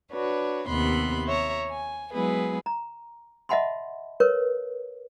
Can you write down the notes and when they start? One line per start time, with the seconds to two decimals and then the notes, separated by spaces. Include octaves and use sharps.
0.12 D4 F#4 B4 C#5
0.68 D#2 C3 B3 B5 C6 F#6
1.27 C#5 E5 A#5
1.68 G#5
2.13 F#3 G#3 B3 E4 G#4 B4
2.66 A#5
3.49 D#5 E5 F#5 A5 B5 C6
4.20 A#4 B4 C#5 C#6